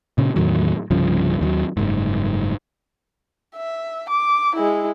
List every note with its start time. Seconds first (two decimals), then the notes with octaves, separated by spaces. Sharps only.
0.18 A#2 C#3
0.36 E2 A2 D#3 F#3
0.91 C2 G2 C#3 F3
1.41 D#2 F3 F#3
1.77 F#1 G#2
3.56 E5
4.09 D6
4.55 G#3 E4